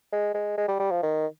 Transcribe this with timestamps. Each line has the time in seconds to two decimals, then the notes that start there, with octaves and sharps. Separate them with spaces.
0.12 G#3
0.35 G#3
0.58 G#3
0.68 G3
0.80 G3
0.91 F3
1.03 D#3